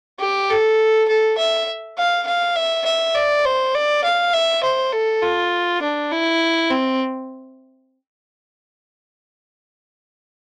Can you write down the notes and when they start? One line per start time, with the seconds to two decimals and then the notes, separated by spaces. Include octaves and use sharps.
0.20 G4
0.50 A4
1.08 A4
1.37 E5
1.97 F5
2.27 F5
2.56 E5
2.85 E5
3.15 D5
3.45 C5
3.74 D5
4.04 F5
4.33 E5
4.63 C5
4.92 A4
5.22 F4
5.82 D4
6.12 E4
6.70 C4